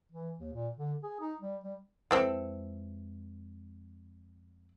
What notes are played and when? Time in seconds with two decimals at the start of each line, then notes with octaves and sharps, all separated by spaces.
0.12 E3
0.39 D#2
0.53 A#2
0.77 D3
1.03 G#4
1.20 D#4
1.40 G3
1.64 G3
2.11 F2 E3 G#3 C4 A4